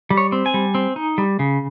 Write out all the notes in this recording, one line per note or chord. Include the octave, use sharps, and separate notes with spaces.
G3
C#5
C4
G#5
G3
C4
D#4
G3
C#3